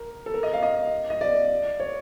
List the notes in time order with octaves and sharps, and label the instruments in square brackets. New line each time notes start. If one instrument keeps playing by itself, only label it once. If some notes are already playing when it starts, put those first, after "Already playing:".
Already playing: [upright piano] A#4
A4
A#4
D#5
F5
D#5
D#5
D5
C#5